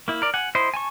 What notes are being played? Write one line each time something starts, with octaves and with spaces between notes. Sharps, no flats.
A#3 E4
A#4 D5
F#5 G#5
E4 C5 D#5
G#5 A5 C#6